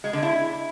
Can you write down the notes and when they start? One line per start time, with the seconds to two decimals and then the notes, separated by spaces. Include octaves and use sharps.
0.04 G#3
0.13 D3
0.23 E4